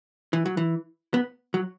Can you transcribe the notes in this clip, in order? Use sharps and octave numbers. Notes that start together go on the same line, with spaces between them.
E3
F#3
E3
B3
F#3